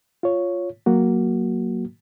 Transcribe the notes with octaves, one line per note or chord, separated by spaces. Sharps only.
F4 C#5
F#3 A#3 F#4